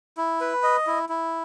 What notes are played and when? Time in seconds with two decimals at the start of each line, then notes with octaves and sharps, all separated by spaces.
0.17 E4
0.41 B4
0.63 D#5
0.87 E4
1.09 E4